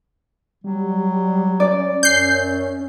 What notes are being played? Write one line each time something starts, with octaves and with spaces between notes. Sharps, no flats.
F#3 G3
C#4 D5
F#2 G6 C7